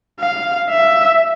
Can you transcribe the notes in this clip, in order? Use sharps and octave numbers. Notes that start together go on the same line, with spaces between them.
F5
E5